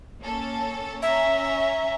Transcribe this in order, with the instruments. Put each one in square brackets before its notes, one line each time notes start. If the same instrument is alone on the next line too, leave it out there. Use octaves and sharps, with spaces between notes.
[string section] A#3 C#4 A4
[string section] C#4 A#5 [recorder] E5